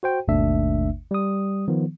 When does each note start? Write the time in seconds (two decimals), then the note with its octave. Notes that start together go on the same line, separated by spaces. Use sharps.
0.03 F#4 C5 G5
0.28 G#1 D#2 B2 A3 D4 E5
1.11 G3 D#6
1.68 D#3 F3 B3